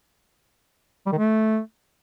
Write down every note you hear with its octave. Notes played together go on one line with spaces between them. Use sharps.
G3
D#3
A3